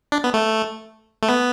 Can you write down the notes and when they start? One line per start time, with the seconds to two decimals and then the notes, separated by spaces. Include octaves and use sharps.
0.12 D4
0.24 B3
0.34 A3
1.23 A3
1.29 B3